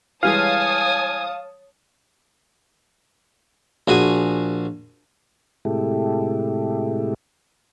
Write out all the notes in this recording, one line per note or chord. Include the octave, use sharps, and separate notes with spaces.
E3 G3 G#3 C#5 F5 G#5 A5 D#6
A#1 F#4 G#4 G#5
A2 C3 G#3 E4 G4 A4